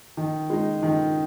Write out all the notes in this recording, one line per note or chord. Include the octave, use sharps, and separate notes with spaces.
D#3
G#3 D#4
D#3